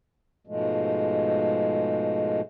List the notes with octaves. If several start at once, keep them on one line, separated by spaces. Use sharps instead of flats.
G#2 B2 F3 G#3 A3